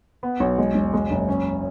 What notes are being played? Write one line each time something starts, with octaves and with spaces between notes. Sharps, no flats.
B3
B1
G#3
E1
G#3
F#1
C#4